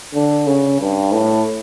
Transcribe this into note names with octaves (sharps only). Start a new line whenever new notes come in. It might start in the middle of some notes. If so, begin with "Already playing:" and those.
D3
C#3
G2
A2